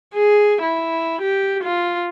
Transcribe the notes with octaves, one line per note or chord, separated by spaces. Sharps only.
G#4
E4
G4
F4